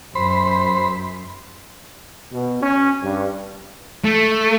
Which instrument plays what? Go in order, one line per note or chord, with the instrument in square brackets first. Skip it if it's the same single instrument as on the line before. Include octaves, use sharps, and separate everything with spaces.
[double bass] F#2 [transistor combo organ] C5 B5
[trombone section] B2
C#4
G2
[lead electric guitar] A3